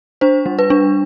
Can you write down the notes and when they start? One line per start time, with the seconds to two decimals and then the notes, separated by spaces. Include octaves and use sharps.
0.21 D4 C5
0.46 G3
0.59 B4
0.70 D4